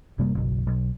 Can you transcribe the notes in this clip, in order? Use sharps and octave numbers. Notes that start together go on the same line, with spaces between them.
F#1 C3 G3 A#3
F#1 B1
B1